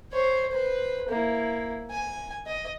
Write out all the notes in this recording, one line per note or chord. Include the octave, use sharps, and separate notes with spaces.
C5 C#5
B4 C5
A#3 E4
G#5
D#5